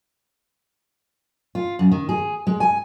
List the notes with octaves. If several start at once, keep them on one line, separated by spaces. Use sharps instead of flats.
F4
F#2
D#3
G#4
G#3
G#5